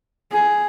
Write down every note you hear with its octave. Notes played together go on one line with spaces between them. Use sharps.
G#4